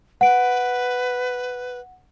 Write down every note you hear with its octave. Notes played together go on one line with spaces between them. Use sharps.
B4 F#5 D7